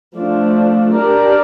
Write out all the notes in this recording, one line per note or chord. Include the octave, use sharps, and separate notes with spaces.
F3 A3 D4
D4 G4 A#4 D5